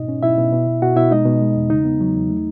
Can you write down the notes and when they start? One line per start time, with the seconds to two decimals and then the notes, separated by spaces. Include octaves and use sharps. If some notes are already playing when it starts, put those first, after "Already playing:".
Already playing: G#2 B2 D#4 D#5
0.08 C#4
0.23 B2 E4 E5
0.38 B2
0.53 B2
0.67 B2
0.82 B2 F#4 F#5
0.96 B2 E4 E5
1.11 G#3 D#4 D#5
1.26 B2
1.41 G#3
1.56 E2
1.70 C#3 D#4
1.85 B3
2.01 F#3
2.15 E2
2.30 A3